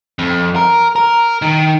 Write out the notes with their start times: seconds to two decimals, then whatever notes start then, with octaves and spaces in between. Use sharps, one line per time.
0.19 F2
0.56 A#4
0.96 A#4
1.42 D#3